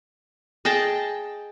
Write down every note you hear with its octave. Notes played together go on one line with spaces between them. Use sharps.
G#4 D#5 G5 A5